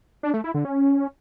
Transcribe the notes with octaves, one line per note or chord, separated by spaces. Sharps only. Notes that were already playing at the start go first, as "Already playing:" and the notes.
D4
A3
E4
D3
C#4